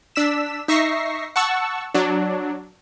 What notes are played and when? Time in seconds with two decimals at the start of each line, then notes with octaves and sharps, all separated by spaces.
0.16 D4 E6 B6 E7
0.68 D#4 E5 C#6 A#6 C7
1.36 F#5 A5 C#6 E6
1.94 F#3 D4